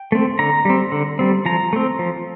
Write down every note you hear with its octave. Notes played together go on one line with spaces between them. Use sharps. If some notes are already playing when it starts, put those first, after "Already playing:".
Already playing: G5
A3 C4
D3 A#5
G3 C4
D3
G3 C4
F3 A#5
A3 C4
F3